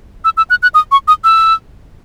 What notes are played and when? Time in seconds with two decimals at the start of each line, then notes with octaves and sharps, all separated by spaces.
0.25 E6
0.37 E6
0.50 F#6
0.63 F#6
0.74 D#6
0.92 C#6
1.08 D#6
1.24 E6